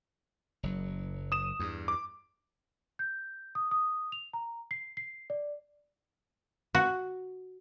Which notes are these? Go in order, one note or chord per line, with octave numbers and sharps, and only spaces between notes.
F#1 F#3
D#6 E7
E2 G2
D6
G6
D#6
D#6
F7
A#5
C7
C7
D5
F#4